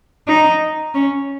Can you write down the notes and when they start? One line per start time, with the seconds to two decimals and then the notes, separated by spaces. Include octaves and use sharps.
0.28 D#4
0.94 C#4